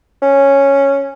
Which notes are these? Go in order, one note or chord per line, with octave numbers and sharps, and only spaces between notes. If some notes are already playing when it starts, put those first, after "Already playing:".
C#4